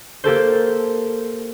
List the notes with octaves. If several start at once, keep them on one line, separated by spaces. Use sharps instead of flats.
A#3 G4 A4 C5